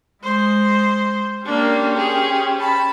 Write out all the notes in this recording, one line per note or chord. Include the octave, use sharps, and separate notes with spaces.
G#3 C5
A#3 C#4 D4 G4 C5
G#4
A5 B5